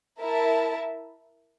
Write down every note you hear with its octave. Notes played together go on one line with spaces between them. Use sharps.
E4 A#4 E5 A5